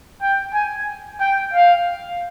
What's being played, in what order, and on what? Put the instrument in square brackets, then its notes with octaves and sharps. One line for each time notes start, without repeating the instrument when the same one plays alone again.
[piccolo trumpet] G5
G#5
G5
F5